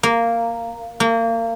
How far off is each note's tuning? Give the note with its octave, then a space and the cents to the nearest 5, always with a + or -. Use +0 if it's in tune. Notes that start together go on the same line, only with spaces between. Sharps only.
A#3 -10
A#3 -30